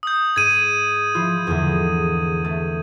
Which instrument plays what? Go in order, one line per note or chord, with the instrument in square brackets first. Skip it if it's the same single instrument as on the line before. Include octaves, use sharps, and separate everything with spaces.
[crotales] D#6 G6
[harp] G#2 [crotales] G#6 D#7
[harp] F3 E4 F4
E2 G#2 D3
A3